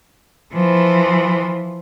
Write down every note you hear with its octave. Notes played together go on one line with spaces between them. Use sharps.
E3 F3